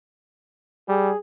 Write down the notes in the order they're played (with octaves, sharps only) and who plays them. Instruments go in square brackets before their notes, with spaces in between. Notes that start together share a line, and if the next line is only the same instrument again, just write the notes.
[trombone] G3 [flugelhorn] G#4